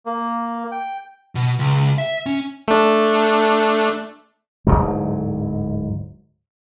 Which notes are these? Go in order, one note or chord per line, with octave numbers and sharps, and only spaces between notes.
A#3
G5
B2
C#2
E5
C#4
A3 D4
D1 C#2 G#2 F#3